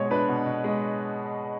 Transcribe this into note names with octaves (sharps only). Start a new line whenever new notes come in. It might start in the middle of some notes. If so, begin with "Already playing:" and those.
Already playing: B2 G#3 C#5
D4 B4
B2
B2
G#3